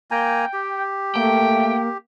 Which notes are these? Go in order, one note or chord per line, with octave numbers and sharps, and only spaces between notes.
A#3 G5 G#5 A#5
G4
A3 A#3 G5